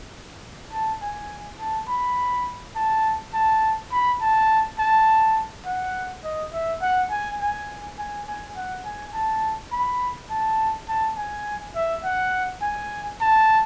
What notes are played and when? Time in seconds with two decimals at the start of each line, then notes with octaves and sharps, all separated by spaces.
0.73 A5
1.01 G#5
1.59 A5
1.88 B5
2.76 A5
3.34 A5
3.92 B5
4.21 A5
4.79 A5
5.66 F#5
6.24 D#5
6.53 E5
6.82 F#5
7.10 G#5
7.40 G#5
7.98 G#5
8.27 G#5
8.56 F#5
8.85 G#5
9.14 A5
9.72 B5
10.30 A5
10.88 A5
11.17 G#5
11.76 E5
12.04 F#5
12.62 G#5
13.21 A5